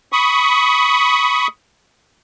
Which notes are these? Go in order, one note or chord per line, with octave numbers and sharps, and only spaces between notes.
B5 C#6 D#6